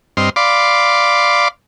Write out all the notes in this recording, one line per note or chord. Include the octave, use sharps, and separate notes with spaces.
G2 C4 D#5 C6 F6
D5 F5 B5 C6 D6